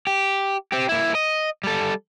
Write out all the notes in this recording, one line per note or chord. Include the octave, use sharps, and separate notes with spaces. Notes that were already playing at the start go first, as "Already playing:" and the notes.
G4
C4 G4
A#3 E4
D#5
G3 A4